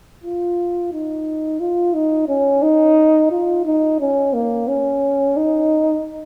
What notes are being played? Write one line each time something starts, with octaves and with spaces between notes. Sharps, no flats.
F4
D#4
F4
D#4
C#4
D#4
F4
D#4
C#4
A#3
C#4
D#4